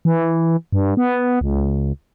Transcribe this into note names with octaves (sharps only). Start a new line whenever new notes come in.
E3
G2
B3
C#2